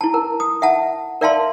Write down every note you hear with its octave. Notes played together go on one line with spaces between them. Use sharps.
E4 A5
A#4
D#6
E5 F#5 A5
A#4 D5 E5 F5 A5 C6